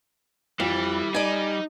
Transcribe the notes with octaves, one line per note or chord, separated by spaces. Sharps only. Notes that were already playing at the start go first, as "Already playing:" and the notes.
F2 E3 G3
D#4 D5 G#5